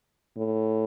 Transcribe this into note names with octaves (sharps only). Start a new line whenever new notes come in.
A2